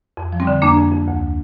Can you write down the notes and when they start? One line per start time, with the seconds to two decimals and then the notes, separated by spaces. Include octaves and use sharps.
0.17 F2
0.33 F3
0.40 G3 C4
0.47 D3
0.62 F2 A#3 D4
0.78 F2
0.92 F2
1.08 D2